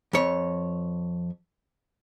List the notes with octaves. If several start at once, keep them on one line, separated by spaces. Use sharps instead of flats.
F2 C#5